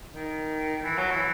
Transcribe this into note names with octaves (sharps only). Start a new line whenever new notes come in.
D#3
E3
F#3
E3